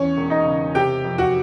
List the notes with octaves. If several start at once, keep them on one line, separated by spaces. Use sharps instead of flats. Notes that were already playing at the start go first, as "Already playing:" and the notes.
Already playing: E2 C#4 C#5
E1
D#4 D#5
C#3
C3 G4 G5
F2
F#4 F#5